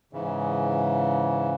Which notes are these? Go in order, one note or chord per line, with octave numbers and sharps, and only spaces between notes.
G#2 C#3 E3